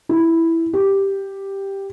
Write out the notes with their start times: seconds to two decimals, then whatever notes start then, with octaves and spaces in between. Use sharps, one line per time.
0.09 E4
0.73 G4